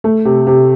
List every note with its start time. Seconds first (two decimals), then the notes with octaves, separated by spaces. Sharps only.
0.04 A3
0.25 C3
0.47 C3